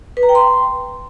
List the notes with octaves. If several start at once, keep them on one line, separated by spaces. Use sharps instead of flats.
B4
A#5
G5
C6